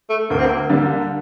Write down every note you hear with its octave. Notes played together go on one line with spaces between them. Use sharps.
A3
D2 A#3
C4
A#3
D3 G3 A#3